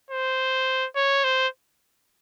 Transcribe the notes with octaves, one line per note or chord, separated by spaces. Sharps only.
C5
C#5
C5